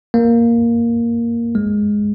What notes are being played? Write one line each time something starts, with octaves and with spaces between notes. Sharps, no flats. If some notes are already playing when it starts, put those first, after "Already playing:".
A#3
G#3